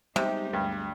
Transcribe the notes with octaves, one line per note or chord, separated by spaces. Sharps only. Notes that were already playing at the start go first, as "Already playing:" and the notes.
C3 G3 G#3 B3 D#4 G4
D2 G2